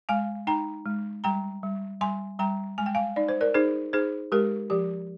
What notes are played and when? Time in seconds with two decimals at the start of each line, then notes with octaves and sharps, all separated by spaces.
0.09 G#3 F5 G#5
0.47 D#4 G5 A#5
0.86 G#3
1.24 G3 G5 A#5
1.63 G3
2.01 G3 G#5 C6
2.39 G3 G5 A#5
2.78 G#3 G#5
2.86 G5
2.95 F5 G#5
3.16 D#4 D5
3.28 C5
3.41 A#4 D5
3.54 D#4 G#4 C5
3.93 D#4 G#4 C5
4.32 G#3 G4 A#4
4.70 F3 G4